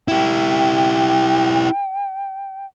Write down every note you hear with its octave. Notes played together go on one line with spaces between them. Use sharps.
E4 G4 G5